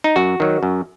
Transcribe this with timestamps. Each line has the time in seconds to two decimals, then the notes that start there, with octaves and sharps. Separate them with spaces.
0.04 D#4
0.16 F#2 F#4
0.40 D#3 F#3
0.63 F#2